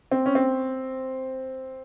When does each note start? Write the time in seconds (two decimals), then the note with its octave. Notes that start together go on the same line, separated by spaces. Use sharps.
0.11 C4
0.26 C#4
0.35 C4